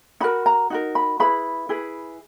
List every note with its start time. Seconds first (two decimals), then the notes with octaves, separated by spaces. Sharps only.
0.21 D#4 F#4 A#4 B5
0.46 A#5
0.70 D#4 F#4 A#4
0.95 B5
1.20 E4 G#4 B4 B5
1.69 E4 G#4 B4